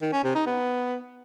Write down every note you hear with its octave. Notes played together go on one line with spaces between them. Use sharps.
D#3
C#4
C3
D#4
B3